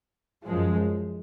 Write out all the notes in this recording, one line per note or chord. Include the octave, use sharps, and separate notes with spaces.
F#2 F3 G#3